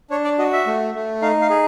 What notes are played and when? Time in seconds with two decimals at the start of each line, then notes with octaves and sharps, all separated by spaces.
0.10 D4 C#5
0.24 D5
0.38 F#4 D#5
0.53 E5
0.67 A3
0.95 A3
1.22 D#4 F5
1.41 F5
1.50 G#4